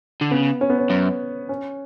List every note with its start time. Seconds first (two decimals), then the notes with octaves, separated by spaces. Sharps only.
0.21 D3
0.31 C#3 B3
0.61 C#4
0.70 B3
0.78 C#4
0.90 F#2
1.49 C#4